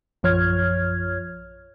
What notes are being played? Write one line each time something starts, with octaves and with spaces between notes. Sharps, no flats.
A#1 F#2 F3 C#5 F6 G#6